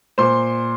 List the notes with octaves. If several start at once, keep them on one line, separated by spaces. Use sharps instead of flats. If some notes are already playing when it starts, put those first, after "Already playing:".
A#2 C5 C6